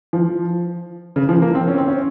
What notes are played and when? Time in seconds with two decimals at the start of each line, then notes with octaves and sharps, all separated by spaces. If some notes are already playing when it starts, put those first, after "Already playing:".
0.13 F3
1.16 C#3
1.29 F3
1.42 A#3
1.55 C4
1.68 C#4
1.78 C4
1.88 C#4